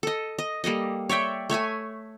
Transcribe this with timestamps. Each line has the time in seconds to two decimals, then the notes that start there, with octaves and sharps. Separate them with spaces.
0.03 A4 D#5
0.39 D#5
0.64 G3 A#3 A4 D#5
1.09 C#5 D5 E5 G5
1.50 A3 C#5 E5 G#5